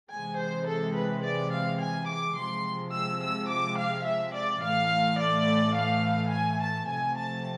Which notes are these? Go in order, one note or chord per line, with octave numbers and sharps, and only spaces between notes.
C3 E3 G#3 G#5
C5
A4
B4
D5
F5
G#5
D6
C3 F3 G#3 C6
E6
E6
D6
F5
E5
D5
A2 E3 A3 F5
D5
F5
G#5
A5
C3 F3 A3 G#5
A5